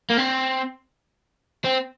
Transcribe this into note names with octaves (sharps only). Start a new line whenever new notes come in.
A#3
C4
C4